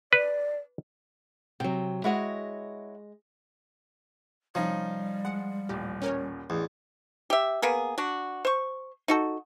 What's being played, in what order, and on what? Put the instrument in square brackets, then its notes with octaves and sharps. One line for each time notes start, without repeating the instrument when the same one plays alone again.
[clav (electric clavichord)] B4 [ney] D5
[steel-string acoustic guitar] C3 F#3 [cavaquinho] G5
[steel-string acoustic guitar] G#3 D#5 [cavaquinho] E4 F#4 C#5
[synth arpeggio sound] C3 [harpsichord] F3 [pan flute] G3 [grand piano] C#4 D#4
[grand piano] G#3 C#7 [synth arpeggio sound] F#5
[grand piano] D#1 A1 [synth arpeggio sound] G4
[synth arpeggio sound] C#4 A#4 C#5
[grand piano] A1 [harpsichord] E2
[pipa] G4 E5
A#3 B3 G#4
D4 F#4
C5 C#6
D#4 F#4 A4